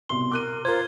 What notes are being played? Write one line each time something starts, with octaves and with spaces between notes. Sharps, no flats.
C2 B2 C6 G7
A#4 D6 F#6 D#7
F4 A#4 C5 G#6